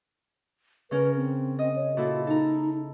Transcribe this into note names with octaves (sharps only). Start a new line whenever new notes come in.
C#3 C#4 A#4 B4
C4
D#5
C#5
A#2 E4 F#4 A4
D#4 A4 A#5